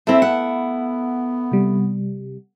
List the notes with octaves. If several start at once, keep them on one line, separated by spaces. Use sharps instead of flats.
A3 C4 E4 A4
B3 F#5
C3 G3